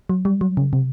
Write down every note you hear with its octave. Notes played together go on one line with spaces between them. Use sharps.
F#3
G3
F#3
C#3
C3